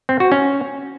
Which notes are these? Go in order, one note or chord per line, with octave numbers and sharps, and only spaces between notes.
C4
F#4
C#4